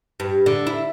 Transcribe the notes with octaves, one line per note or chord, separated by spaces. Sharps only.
G2
D3
E4